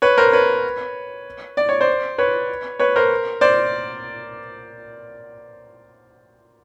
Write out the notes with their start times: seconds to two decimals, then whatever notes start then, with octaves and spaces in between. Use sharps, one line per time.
0.02 B4 C#5
0.18 A#4 C5
0.33 B4 C#5
1.57 D5
1.69 C#5
1.81 C5 D5
2.18 B4 C#5
2.79 B4 C#5
2.96 A#4 C5
3.41 C5 D5